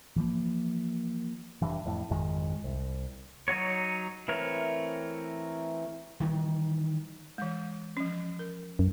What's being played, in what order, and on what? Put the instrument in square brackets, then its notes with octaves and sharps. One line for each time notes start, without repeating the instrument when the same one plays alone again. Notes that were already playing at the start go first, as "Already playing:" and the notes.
[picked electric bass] E3 F3 A#3
F1 G2 E3
F2 A2
G#1 F2 D#3 G#3
C2
[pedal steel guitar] F#3 D#4 F#4 C#5
E3 A3 C4 A#4 C#5
[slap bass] D#3 E3 G3
[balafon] E3 G#3
F3 C#4
A#4
[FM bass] F#2